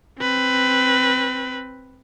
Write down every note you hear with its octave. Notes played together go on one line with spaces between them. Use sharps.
C4 B4